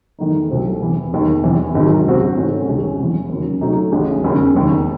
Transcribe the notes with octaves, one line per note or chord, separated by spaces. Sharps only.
E2 D#3 A3 D#4
C2 C3 F#3 A3 C4
E2 C3 E3
E1 D#2 D#3
E2 C3 E3
G#1 G#2 F#3
C#2 C3 F#3 C4 F#4
G#2 E3 A3 C#4 F#4
C2 C3 D#3 G#3 C#4
E2 C3 E3
D#2 C#3 F#3
C3 F#3 A3 D#4
A1 A2 G#3
E1 D#2 C#3 G#3
E1 D#2 D#3